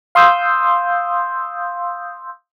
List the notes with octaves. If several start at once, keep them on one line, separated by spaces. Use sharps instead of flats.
F5 C6 D#6 E6 G6